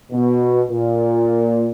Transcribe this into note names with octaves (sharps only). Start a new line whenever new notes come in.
B2
A#2